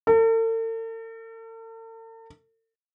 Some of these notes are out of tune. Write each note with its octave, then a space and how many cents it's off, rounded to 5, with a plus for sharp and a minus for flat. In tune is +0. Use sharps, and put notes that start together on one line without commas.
A4 +45